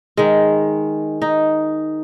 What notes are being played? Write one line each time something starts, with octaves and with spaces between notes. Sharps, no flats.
D#3 G#3
D#4